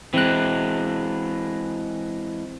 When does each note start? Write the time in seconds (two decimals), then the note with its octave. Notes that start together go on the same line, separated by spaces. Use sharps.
0.14 E3 G#3 C4 F#6